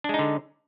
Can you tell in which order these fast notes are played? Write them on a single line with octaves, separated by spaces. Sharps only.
D4 G#3 D#4 D3